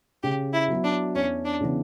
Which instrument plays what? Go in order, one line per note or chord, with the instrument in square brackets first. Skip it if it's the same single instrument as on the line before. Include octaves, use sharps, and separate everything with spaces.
[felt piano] C#3 [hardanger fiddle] G4
[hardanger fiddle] E4
[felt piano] F#3 B3 F#4
[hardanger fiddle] D4
[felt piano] E2 [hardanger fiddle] C#4
[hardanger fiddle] D4
[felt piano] C#3 E3 B3